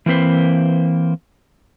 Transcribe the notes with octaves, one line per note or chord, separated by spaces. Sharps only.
E3 A#3 C4 B4 C5